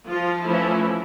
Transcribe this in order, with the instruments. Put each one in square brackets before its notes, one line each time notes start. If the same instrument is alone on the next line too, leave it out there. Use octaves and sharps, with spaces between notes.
[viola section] F3 F4
E3 F3 A3 C#4 E4